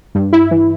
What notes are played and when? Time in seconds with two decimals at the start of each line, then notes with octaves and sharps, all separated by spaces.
0.15 G2
0.33 E4
0.51 E3